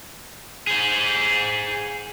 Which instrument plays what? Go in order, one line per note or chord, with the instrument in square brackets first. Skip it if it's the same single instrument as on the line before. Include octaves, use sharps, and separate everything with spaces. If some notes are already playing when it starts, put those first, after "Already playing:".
[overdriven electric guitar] G#4 C5